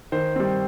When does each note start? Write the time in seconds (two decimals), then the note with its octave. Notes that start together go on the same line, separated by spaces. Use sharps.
0.12 D#3 C5
0.36 G3 C4